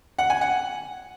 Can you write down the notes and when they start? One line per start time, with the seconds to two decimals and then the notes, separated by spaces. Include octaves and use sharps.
0.19 F#5
0.30 G#5
0.41 F#5